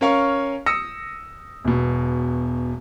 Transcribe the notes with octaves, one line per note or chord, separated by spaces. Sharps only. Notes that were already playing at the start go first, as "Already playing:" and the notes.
C#4 A#4 C#5 F5 C#6
D#6 E6 A#6 C#7
E1 B2